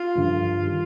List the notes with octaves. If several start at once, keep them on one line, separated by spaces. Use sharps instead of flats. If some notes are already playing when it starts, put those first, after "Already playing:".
Already playing: F4
G2 D3 F3
D#3 G3